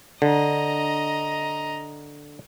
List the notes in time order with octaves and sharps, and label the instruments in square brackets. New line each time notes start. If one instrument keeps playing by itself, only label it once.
[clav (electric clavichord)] D3 [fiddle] D#5 A#5